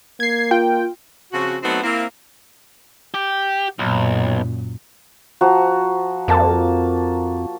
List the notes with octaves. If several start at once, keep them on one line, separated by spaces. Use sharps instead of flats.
A#3 G#6 C7
F4 G5
C#3 F3 C4 F#4
F#3 A3 B3 C4 D#4 F#4
A#3 C4 E4
G4
B1 F#2 A#2
F3 F#4 A#5
F2 A#3 A5